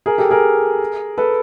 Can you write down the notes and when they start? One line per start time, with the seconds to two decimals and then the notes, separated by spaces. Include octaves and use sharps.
0.06 G#4 A#4
0.18 G4 A4
0.31 G#4 A#4
1.18 A4 B4